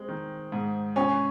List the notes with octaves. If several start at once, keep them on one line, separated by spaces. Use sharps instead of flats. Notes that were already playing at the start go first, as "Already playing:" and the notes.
Already playing: G#3 C4
D#3
G#2
C#4 G#5